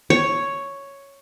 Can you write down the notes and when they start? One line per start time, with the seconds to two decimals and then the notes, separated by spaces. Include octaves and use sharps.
0.10 C#5